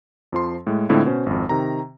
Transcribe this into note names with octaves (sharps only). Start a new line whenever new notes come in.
F2 F3 C6
A2 G#3
A2 D3 G#3 C4 E4 F4
B2 C#4 C5
G#1 F2
C3 D#3 A#5